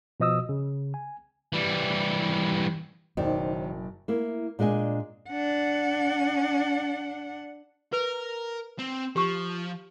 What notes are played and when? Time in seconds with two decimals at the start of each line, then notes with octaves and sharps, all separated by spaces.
0.20 B2 F3 D#5 D#6 E6
0.49 C#3
0.94 G#5
1.53 E3 G3
3.17 F#1 B2 D#3 F#3 D#4 C5 D5 D#5
4.08 A#3 E4
4.59 A#2 G#3 D4 D#5 G#5
5.30 D4 F#5
7.93 A#4 B4
8.79 C4
9.16 F3 G4 C#6